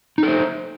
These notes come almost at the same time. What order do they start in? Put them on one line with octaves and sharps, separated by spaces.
D#4 A4 C5